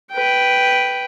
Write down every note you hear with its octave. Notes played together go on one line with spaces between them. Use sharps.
B4 G5